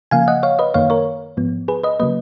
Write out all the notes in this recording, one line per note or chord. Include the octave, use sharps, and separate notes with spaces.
C#3 F3 A#3 F5 G#5
D#5 F#5
C#5 F5
B4 D#5
F#2 D#3 A#3 C#5 F5
A#4 C#5
G#2 F3 B3
G#4 B4
B4 D#5
C#3 F#3 A#3 B4 D#5